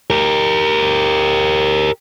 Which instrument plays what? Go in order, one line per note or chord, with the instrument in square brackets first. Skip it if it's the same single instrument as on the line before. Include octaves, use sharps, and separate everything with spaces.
[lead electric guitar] G4 A#4